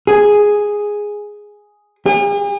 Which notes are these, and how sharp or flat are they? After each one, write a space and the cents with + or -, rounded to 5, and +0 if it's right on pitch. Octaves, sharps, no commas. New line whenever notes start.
G#4 +0
G#4 -45